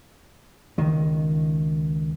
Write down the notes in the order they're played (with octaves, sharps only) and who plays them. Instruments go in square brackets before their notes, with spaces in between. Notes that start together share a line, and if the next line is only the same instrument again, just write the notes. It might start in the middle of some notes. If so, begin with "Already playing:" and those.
[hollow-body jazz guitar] C#2 D#3